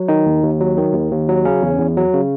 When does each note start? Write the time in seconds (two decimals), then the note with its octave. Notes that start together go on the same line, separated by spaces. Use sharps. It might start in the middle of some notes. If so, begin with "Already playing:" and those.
Already playing: F#3
0.08 D#3 D#4
0.26 D#2
0.43 D#2
0.61 F#3
0.78 D#3
0.94 D#2
1.11 D#2
1.29 F#3
1.45 C#3 C#4
1.62 E2
1.79 E2
1.97 F#3
2.14 C#3